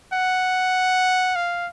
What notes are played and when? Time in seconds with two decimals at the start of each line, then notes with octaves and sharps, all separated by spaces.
0.13 F#5
1.36 F5